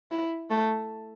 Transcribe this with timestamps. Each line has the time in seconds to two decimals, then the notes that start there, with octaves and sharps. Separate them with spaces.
0.11 E4
0.50 A3